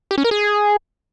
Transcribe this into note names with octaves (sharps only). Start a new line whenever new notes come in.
G4
C#4
A#4
G#4